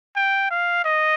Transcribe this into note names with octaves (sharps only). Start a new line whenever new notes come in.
G5
F5
D#5